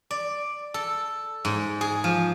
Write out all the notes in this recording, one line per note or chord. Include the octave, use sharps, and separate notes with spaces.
D5
A4
G#2
G#4
F3